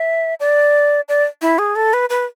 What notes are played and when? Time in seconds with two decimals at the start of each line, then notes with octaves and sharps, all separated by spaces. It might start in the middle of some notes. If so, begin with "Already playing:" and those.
Already playing: E5
0.40 D5
1.09 D5
1.42 E4
1.59 G#4
1.76 A4
1.93 B4
2.10 B4